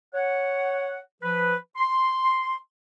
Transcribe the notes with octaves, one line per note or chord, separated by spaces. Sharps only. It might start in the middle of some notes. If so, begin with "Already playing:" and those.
C#5 F#5
F3 B4
C6